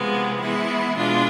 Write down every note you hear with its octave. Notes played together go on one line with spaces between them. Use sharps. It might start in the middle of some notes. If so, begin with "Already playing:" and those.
Already playing: C3 F3 G#3 B3
E3 G#3 B3 E4
B2 G#3 D4 F4